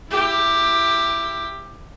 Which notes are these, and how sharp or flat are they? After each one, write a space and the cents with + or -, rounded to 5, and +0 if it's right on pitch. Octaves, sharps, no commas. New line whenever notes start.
E4 +20 G4 +10